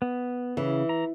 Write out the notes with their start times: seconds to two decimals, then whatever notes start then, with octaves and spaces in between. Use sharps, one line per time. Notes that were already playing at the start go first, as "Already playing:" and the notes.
0.02 B3
0.57 C#3 E3
0.89 A#5